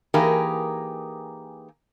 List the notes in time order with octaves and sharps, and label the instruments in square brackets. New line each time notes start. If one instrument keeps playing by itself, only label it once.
[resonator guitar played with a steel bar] E3 A#3 D#4 G4 G#4 A#4